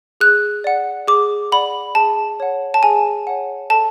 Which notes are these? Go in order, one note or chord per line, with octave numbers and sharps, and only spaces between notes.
G#4 F#6
D5 F#5
G#4 D6
D5 F#5 B5
G#4 A5
C#5 F#5
A5
G#4 G#5
C#5 F#5
A4 A5